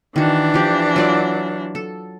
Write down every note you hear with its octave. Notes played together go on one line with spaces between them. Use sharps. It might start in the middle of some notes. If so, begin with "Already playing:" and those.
D#3 E3 D4 F#4
F3 G4 D5
F#3 F4 D5
A4